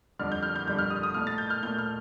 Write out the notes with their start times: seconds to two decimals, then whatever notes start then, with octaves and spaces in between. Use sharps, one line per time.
0.19 F2 D3 G3 F6
0.32 G6
0.43 F6
0.56 G6
0.67 F2 D3 G3 G6
0.78 F6
0.90 D#6
1.03 D#6
1.14 A#2 A3 F6
1.27 A6
1.38 G6
1.50 F6
1.63 A#2 A3 G6
1.78 F6